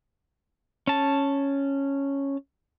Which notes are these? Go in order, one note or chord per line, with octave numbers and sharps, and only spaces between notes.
C#4 A5